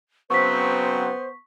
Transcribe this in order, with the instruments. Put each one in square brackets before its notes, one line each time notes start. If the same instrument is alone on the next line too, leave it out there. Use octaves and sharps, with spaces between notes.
[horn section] C#3 F#3 C4 [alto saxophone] B3 [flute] C5 [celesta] C#6 B6